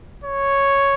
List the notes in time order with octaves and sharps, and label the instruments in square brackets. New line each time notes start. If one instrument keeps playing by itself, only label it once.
[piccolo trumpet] C#5